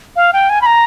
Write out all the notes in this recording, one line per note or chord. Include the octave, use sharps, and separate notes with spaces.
F5
G5
G#5
B5
A#5